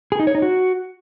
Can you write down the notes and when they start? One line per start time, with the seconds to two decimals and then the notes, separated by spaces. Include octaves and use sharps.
0.12 G#4
0.19 D#4
0.27 C#5
0.35 D#4
0.42 F#4